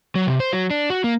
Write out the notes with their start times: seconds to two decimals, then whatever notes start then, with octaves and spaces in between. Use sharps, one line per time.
0.15 F#3
0.27 C3
0.40 C5
0.53 F#3
0.71 D4
0.90 F#4
1.04 A#3